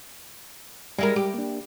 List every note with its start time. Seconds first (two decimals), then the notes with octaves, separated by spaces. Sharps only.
0.98 G3 G#3 E4 A#4
1.16 G4
1.34 A#3 D4